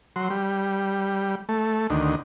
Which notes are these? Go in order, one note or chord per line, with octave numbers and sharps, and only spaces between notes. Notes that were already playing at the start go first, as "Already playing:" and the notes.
F#3 C6
G3
A3
D2 D#3